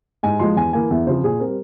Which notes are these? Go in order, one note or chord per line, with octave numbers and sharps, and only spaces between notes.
G#2 G#5
F3 G#3 C6
E2 G#5
E3 A#3 G#5
E2 E5
C#3 F3 C4 C5
A#2 G#4
G3 C4 A#4